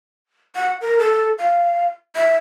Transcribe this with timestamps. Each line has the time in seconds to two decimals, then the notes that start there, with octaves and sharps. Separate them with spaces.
0.55 F#5
0.81 A#4
0.99 A4
1.38 F5
2.16 E5